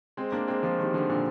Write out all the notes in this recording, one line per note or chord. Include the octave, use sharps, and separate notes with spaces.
G#3 C4
A#3 D4
G#3 C4
F3 G#3
D#3 G3
D3 F3
A#2 D3